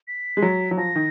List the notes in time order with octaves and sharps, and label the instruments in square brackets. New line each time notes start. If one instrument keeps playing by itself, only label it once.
[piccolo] B6
[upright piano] G#3
F#3
F#3
[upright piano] F3 [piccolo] A#6
[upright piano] D#3